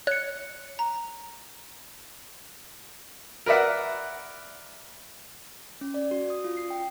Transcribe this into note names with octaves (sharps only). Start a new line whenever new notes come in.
C#5 F#6 C#7
A#5
A#4 B4 D5 E5 F#5
C#4
D5
F#4
D#6
F4
C7
G5